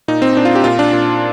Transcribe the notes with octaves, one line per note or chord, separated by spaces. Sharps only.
A#2 D#4
C4
A#2 D4
F4
G4
A#2 F4
D4
A#2